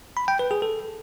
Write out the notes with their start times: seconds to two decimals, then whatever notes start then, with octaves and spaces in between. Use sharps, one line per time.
0.17 B5
0.28 G5
0.39 B4
0.51 G#4
0.62 A4